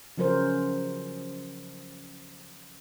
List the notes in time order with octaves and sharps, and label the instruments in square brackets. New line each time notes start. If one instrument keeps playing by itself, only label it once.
[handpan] C#3 F3 F#3 C#4 A#4 C5